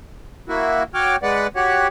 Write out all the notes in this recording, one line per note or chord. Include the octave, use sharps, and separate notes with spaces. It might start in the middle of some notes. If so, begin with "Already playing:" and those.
A#3 E4 F#4
F#4 C#5 G5 D6 F6
G#3 B4 D5 F#5
F#4 G4 C#5 F#5